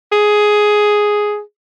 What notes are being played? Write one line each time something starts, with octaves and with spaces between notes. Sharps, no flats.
G#4